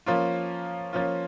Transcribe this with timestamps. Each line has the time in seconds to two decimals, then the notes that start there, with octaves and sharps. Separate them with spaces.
0.06 F3 A#3 C#4 F4
0.93 F3 A#3 C#4 F4